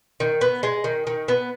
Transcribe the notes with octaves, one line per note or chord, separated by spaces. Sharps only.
D#3
B3
G#3
D#3
D#3
B3